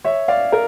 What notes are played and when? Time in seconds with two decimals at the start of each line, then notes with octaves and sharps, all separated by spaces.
0.04 C#5 E5
0.28 D5 F5
0.52 A#4